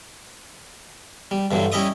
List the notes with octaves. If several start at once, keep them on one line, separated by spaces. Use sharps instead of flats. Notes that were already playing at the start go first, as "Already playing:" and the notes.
G3
G2 D3 E3 F#3
G3 C#4 E4 D#5 E5 D#6